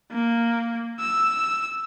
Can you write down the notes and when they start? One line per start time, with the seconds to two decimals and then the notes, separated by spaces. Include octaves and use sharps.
0.11 A#3
1.00 E6